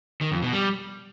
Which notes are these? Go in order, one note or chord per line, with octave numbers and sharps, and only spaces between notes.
D#3
F2
B2
G3